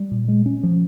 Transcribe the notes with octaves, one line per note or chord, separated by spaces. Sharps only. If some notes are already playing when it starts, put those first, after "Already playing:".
Already playing: G3
A#2
G#3
C#4
F3